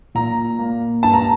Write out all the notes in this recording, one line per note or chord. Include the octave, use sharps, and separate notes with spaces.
A#2 A#5
A#3
G2 A5
A#5